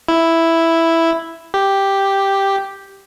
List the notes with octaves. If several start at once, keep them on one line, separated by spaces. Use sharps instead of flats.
E4
G4